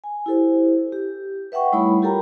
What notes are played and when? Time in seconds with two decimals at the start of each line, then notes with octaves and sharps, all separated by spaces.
0.04 G#5
0.26 E4 G4 A4 C5
0.92 G4
1.52 B4 E5 F#5 G5 C#6
1.72 G3 A3 D#4 E4 C#5 B5
2.02 F4 G4 A4 A#4 G5 A#5